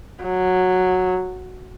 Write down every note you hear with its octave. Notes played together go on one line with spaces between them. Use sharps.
F#3